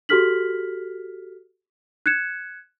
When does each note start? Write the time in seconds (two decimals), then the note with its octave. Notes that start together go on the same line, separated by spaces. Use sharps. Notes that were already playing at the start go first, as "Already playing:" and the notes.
0.09 F#4 G4 A4 F6 B6 F#7
2.06 F#6 G#6 C#7 E7